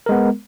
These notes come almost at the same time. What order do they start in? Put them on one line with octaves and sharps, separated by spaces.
A#4 G#3 B3